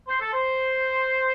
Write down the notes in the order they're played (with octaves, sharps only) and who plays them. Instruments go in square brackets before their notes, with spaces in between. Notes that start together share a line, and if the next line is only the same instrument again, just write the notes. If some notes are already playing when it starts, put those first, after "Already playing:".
[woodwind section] C5
A4
C5